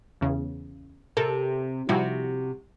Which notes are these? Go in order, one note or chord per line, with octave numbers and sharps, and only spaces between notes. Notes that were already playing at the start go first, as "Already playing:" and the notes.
E2 C#3
C3 A4 A#4
C3 F3 G3 E4 F#4